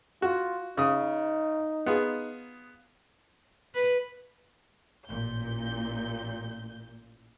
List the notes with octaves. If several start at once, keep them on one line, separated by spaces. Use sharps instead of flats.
F4 F#4
C#3 D#4 D#6
B3 F4 G#4
B4
A1 A#2 G6